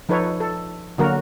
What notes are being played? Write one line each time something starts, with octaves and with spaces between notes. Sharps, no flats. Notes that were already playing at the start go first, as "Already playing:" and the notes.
F3 D#4 A4 B4 C#5
A4
D3 F#3 A#3 F#4 A#4